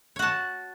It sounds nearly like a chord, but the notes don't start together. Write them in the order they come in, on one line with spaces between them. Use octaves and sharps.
C#5 F#4 A5